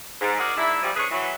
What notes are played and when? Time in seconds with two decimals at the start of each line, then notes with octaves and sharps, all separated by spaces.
0.21 G#2
0.39 F#4 G#4 A#4 D5
0.57 G#2 D4 E4
0.83 E3 F3 G3
0.96 D4 G#4 B4 C#5
1.11 E3 F#3